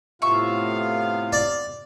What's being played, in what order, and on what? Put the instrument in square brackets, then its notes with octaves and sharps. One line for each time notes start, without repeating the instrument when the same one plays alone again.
[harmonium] A2 F4 [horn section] C3 B3 F5 [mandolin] E5 C#6
[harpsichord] D5